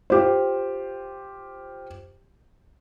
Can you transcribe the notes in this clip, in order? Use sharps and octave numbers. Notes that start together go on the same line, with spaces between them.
F4 G4 C5